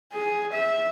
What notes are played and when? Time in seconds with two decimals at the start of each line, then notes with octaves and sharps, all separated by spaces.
0.13 G#4
0.53 E5